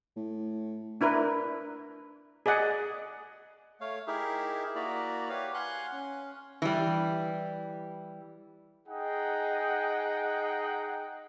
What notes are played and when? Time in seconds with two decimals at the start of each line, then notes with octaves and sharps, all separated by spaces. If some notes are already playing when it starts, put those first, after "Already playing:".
0.16 A2
1.01 D4 E4 A#4 B4
2.46 G#4 D5 D#5 F#5
3.81 A3 C#5 F5
4.07 D#4 E4 G4 G#4 A#4 E5
4.75 A#3 E4 F#4 D5 A#5 B5
5.29 G4 B4 C#5 F5
5.54 F5 F#5 G#5 C6 F#6
5.92 C#4
6.62 E3 G3
8.87 D#4 G#4 F#5 G5